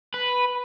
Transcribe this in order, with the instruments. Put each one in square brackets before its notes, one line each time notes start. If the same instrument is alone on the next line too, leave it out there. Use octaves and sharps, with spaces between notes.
[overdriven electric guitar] B4